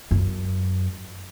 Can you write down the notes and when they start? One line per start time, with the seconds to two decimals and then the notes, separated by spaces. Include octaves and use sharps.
0.11 F#2